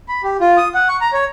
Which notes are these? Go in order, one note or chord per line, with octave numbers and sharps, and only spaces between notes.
B5
G4
F4
D#6
F#5
C#6
A#5
C#5